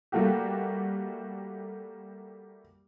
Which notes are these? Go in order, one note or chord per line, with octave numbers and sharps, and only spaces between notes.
G3 A3 A#3 F#4 G4